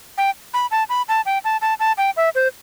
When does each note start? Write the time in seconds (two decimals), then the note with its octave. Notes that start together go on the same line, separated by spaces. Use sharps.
0.18 G5
0.54 B5
0.71 A5
0.89 B5
1.09 A5
1.26 G5
1.44 A5
1.62 A5
1.80 A5
1.98 G5
2.17 E5
2.35 C5